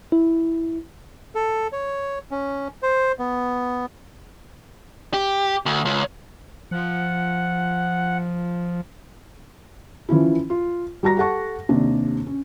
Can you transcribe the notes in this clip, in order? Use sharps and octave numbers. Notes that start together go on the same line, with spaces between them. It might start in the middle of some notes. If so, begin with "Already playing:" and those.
E4
A4
C#5
C#4
C5
B3
G4
D2
C#2
F3 F#5
E3 F3 C#4 E4
F4
G3 F#4 A#5 A#6
G4 A4 F#5 A5 C#6
D#2 C3 D4
C#4